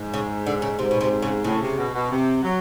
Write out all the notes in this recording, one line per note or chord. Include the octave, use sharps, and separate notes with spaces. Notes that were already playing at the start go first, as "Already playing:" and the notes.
Already playing: G#2
C#3
D3
C#3
G#2 C3
B2
C3
C#3
A2 C#3
C3
B2
B2
C3
F#3